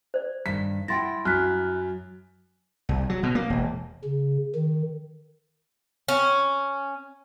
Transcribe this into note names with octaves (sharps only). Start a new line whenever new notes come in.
C5 D5
G2 D#3 B6
E4 F#5 G5 C6 A6 A#6
F#2 F6 F#6 B6
C2
F#3
B2
A#3
E1
C#3
D#3
C#4